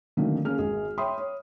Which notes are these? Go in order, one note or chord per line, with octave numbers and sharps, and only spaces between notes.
D3 D#3 F#3 A3 A#3 C4
A#3 C#4 G#4 F6
G#1 G#4
C#5 E5 G5 B5 C6 D#6
C#5